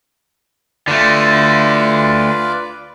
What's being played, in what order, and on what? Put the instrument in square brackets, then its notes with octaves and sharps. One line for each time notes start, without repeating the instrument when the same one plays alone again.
[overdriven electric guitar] D3 A3 [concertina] F4 B4 D5